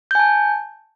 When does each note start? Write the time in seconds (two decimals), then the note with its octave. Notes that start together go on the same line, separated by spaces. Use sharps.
0.11 G6
0.15 G#5
0.19 A5